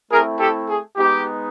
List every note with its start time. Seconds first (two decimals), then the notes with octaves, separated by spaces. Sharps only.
0.10 A3 C4 E4 G#4 A#4
0.38 G4 A4
0.68 G#4
0.96 G#3 B3 D#4 G4